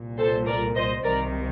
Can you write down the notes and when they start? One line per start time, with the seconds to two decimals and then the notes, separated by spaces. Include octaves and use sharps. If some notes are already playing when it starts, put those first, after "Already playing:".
Already playing: C2 A#2
0.18 A4 C5
0.46 A#4 D5
0.76 C5 D#5
1.04 C2 C3 D#3 A#4 D5